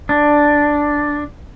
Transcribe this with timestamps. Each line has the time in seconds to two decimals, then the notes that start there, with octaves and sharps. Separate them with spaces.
0.09 D4